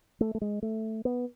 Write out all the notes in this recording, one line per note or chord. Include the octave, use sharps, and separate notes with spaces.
A3
A3
G#3
A3
B3